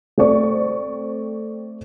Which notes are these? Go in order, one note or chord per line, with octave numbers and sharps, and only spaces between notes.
A3 C4 D5 C#6